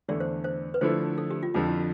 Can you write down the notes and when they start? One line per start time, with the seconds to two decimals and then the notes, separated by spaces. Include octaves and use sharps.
0.08 E2 D3 A3 D5
0.20 C5
0.44 C5
0.74 B4
0.81 D3 F3 A3 E4 C5
1.18 A4
1.31 G4
1.43 F4
1.54 F2 D3 F3 F4
1.67 E4